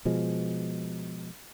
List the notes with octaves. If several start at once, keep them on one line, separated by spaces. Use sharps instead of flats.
B2 F3 G#3